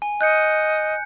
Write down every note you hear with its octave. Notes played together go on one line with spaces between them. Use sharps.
G#5
D#5 F#6 G6 C#7